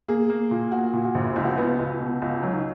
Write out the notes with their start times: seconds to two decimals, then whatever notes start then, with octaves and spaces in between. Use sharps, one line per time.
0.08 A#3 G#4
0.30 A#3
0.51 A#2
0.72 A#3 F#4
0.93 A#2
1.05 F#4
1.15 A#1
1.36 C#2 E4
1.45 F#4
1.55 B3 E4
1.79 C#2
2.00 B2
2.22 C#2
2.43 F#3
2.53 D#4